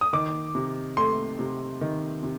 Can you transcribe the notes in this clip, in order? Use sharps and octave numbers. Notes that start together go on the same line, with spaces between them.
D#6
D#3 D6
C3
A3 C6
C3
D#3
C3